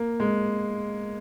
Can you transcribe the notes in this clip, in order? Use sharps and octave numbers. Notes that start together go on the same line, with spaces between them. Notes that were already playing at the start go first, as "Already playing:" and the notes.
Already playing: A#3
G#3